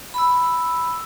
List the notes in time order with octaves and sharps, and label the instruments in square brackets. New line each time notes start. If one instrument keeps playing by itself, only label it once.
[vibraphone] B5 E6